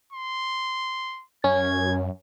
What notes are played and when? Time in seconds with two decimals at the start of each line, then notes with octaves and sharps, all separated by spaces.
0.12 C6
1.44 F#2 C#4 G#6